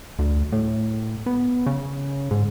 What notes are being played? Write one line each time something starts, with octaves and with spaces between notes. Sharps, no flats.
D2
A2
B3
C#3
G#2